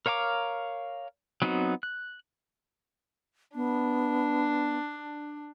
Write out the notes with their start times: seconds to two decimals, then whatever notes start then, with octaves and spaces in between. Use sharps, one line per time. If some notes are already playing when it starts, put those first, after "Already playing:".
0.06 A#4 C#5 F5 A#5 D6
1.42 F#3 B3 C4 D#4 F#4
1.83 F#6
3.55 B3 D4